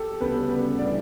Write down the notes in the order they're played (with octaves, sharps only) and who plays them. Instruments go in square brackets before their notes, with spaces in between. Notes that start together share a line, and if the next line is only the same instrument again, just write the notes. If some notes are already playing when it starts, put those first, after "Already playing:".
Already playing: [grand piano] G4 A4
[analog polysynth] D2 C#3 G3 B3 [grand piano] B4
[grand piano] B4
[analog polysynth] A2 E3 G3 D4 [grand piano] D5